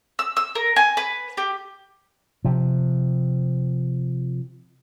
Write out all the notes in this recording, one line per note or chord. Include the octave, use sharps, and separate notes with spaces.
E6
E6
A#4
G#5
B4
G4
C3 F3